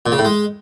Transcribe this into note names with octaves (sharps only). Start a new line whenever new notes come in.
A#2
C#3
A2
G#3